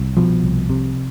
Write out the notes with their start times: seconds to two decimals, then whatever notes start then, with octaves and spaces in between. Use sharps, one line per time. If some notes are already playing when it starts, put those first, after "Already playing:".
Already playing: C2
0.17 B2 F3
0.43 C2
0.70 C3